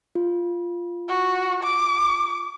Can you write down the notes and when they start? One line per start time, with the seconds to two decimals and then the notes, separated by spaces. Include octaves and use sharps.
0.15 F4
1.08 F#4
1.63 D6